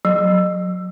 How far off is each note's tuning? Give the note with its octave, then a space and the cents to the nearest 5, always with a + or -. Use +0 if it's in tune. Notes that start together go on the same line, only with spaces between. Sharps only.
F#3 -20